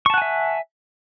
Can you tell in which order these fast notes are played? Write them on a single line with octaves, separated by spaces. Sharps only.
C#6 A5 F#5 G#5 E5